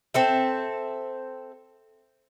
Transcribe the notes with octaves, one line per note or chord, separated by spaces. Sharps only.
C4 A4 E5